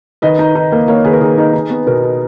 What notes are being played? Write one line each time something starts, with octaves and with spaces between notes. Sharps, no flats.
D#3 B4 D#5
D#4
D#4
A#3
A#3 C#5 F5
D#3 G#4 B4
A#4
D#3 G#4
D#4
D#4
B3
B2 A#4
D#4